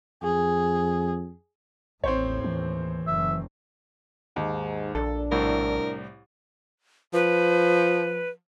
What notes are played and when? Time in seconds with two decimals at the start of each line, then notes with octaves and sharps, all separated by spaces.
0.23 F2 G#4
2.04 A1 D#2 A2 C4 C5 C#5
2.44 E3
3.07 F#1 E5
4.36 D#2 G#2
4.95 A#1 D4 A4
5.32 C2 A2 A#4
7.14 F3 B4